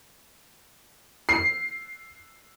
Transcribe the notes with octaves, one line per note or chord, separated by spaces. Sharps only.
C7